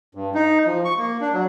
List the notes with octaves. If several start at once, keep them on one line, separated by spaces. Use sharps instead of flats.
G2
D#4
F3
C#6
A#3
D4
F#3